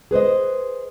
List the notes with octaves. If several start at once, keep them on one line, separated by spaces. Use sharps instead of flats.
G#4 B4 C5 D#5